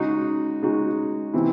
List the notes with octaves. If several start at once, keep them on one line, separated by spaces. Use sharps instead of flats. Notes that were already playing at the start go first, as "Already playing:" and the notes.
Already playing: C#3 G#3 D#4 F#4
C#3 G#3 D#4 F#4
C3 E3 C4 E4